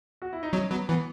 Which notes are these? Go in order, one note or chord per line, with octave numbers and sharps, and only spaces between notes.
F#4
E4
D#4
F#3 C#4
F#3 B3
E3 B3